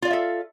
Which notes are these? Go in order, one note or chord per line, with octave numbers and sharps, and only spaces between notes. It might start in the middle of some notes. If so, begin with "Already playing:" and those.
F4 A4 D5 E5 F5